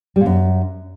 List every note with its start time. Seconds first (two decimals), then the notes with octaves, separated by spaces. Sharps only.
0.16 G3
0.21 A#2
0.26 F#2